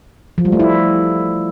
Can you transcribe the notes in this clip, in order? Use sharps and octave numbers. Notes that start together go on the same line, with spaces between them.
F3
G3
A3
E4